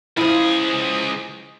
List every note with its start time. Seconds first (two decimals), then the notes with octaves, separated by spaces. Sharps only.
0.17 C#2 F3 E4 G#4